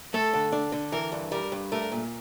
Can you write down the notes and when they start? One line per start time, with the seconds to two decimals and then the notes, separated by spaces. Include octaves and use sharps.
0.13 A3 A4
0.34 D3
0.52 D4
0.72 D3
0.92 E3 A#4
1.12 G2
1.32 G3 A#4
1.52 G2
1.72 A3 A#4
1.92 A#2